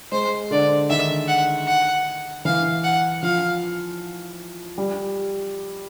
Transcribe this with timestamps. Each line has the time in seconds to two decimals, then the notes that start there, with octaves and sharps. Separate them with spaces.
0.12 G#3 C5
0.51 D3 D5
0.90 D#3 E5
1.28 F#5
1.67 F#5
2.45 E3 F5
2.84 F#5
3.22 F3 F5
4.78 G3